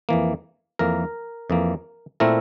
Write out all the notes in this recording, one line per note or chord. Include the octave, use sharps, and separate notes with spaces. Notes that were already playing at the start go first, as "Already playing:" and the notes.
F2 E3 A#3
F2 E3 A#3 A#4
F2 E3 A#3
A#2 A3 C4 E4 A#4